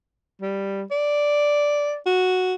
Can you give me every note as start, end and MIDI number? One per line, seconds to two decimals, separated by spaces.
0.41 0.83 55
0.91 1.96 74
2.06 2.55 66